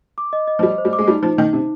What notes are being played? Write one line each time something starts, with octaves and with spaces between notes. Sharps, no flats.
D6
D#5
D#5
F3
G3 D#5
C5
G3
D6
G#3
G3 D#4
F3 D#4
D#3 D#4
C3 D#4